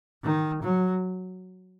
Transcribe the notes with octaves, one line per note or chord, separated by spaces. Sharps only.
D#3
F#3